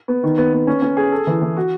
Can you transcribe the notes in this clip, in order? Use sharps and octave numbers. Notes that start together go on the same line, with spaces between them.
B3
D#3
B3
B3
C#4
C#4
G#4
A4
E3
E3
F#4